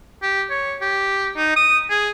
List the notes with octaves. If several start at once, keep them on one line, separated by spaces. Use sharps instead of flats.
G4
C#5
G4
D#4
D#6
G#4